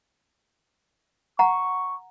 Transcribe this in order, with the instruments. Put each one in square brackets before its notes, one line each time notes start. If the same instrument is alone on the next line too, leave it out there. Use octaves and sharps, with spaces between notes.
[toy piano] F#5 A#5 [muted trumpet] C#6